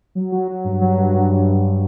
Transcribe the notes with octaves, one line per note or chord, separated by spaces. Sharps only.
F#3
F#3
F#3
G2
F#3
G2
G2
G2
G2